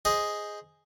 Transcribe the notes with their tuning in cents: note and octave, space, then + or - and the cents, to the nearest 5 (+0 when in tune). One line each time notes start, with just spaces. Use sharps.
G#4 +0 C5 +0 D#5 +0